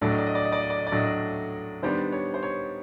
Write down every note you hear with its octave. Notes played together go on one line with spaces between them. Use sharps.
A2 F#3 A3 D4 D5
D#5
D5
D#5
D5
D#5
D5
D#5
D5
D#5
D5
A2 F#3 A3 D4 D#5
D5
D#3 G3 B3 D4 C5
C#5
C5
C#5